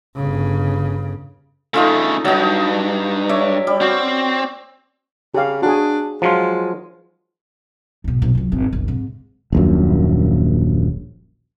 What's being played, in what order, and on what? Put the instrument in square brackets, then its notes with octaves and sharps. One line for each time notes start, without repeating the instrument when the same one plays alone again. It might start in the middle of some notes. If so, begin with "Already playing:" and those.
[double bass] G1 C#3
[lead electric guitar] C#3 A3 [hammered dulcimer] D#4 F4 A4
[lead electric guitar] D2 G2 [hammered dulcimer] F#3 D#4
[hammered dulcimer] C#5 D5 E5
G3
[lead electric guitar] C4 [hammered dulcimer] F#4
[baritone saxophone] C#3 [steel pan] G4 F5
[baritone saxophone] D4 [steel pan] F#4 G#4
[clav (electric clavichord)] F3 F#3 F4 [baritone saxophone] G#3
[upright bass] G#2 B2
B1
C#2 F#3
G#1 G2
G1 C#2
G#2 C3
[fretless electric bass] D#1 A#1 F#2